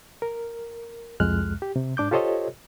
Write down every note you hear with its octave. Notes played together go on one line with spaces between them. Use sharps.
A#4
C2 F2 G#3 F6 F#6
G4
C3
G#2 D4 D6 G6
F4 G4 A4 C5 C#5 D#5